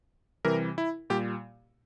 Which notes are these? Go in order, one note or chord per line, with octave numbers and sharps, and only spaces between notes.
C3 E3 G3 A#4
E4
A#2 G3 G4